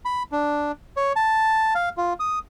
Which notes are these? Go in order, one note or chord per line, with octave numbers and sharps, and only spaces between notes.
B5
D4
C#5
A5
F5
F4
D#6